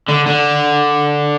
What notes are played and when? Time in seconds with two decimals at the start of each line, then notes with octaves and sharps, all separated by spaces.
0.08 D3
0.26 D3